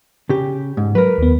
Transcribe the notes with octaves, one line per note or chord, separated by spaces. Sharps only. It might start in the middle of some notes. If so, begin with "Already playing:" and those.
C#3 G4
G#2
F#3 A#4 B4
D#2 B3